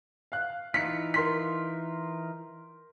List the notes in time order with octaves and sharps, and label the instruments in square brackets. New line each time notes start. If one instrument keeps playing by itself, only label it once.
[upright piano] F5 F#6
[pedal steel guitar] E3 D#4 F4 [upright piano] B6 C#7
[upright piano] A#4 C6 B6